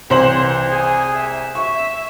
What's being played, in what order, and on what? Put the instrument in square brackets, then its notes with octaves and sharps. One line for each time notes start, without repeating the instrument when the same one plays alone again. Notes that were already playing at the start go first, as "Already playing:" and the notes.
[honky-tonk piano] C2 C5 F#7 [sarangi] E3
[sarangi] G#4
E5
[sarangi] E5 [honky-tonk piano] C#6